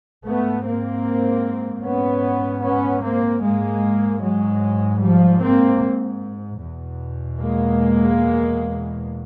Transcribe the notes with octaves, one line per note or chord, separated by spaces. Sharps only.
G#2 A3 B3
A#3 C4
B3 C#4
B3 C#4
A#3 C4
G#2 G#3 A#3
F#3 G#3
F3 G3
A#3 C4
E2 B2
G#3 A#3